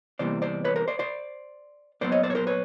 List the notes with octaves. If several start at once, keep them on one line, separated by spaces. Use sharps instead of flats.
E2 C3 E3 G3 A#3 C5 D5
C5 D5
B4 C#5
A#4 C5
C5 D5
C5 D5
A#2 F#3 B3 C5 D5
C#5 D#5
C5 D5
C#5
A#4 C5
B4 C#5